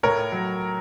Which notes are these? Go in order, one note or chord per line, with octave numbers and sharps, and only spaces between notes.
A2 A#4 C#5
F#3